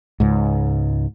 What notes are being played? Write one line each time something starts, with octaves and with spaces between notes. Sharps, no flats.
C#2 G#2